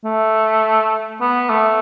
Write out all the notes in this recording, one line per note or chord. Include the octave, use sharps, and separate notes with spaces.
A3
B3
A3